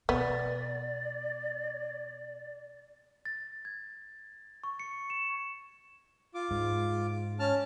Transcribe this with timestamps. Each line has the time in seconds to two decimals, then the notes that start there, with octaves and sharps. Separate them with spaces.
0.09 B2 B3 D5
3.25 A6
3.65 G#6
4.64 C#6
4.79 C#7
5.10 E7
6.34 F4 D6
6.51 G#2
7.39 C#4 A5 F6